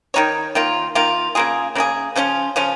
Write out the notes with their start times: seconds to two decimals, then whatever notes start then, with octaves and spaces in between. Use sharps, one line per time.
0.14 D#3 G#3 D#4 C#5
0.55 D#3 A#3 F4
0.95 D#3 A#3 F4
1.35 C#3 A#3 F4 G#4
1.75 C#3 A#3 F4 G#4
2.16 C#3 F3 C#4 F4
2.56 C#3 F3 C#4 F4